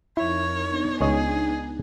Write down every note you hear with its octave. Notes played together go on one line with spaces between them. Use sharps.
F2 D#4 E4 A#4 C#5
B3 D4 D#4
C#2 G#4 C#5 D#5